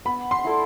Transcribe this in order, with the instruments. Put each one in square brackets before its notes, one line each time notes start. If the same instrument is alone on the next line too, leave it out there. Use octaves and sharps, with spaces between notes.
[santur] B3 [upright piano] B5
[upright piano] C6
[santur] E4 A4 D5